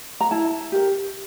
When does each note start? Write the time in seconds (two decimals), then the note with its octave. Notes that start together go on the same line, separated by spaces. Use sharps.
0.21 A#5
0.31 E4 A5
0.72 G4 A#4